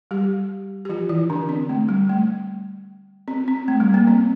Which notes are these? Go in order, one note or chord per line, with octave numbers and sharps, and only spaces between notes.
G3 G4
G4
F3 F4
E3 E4
D3 D4
C4
A3
G3
A3
C4
C4
A3
G3
A#3
C4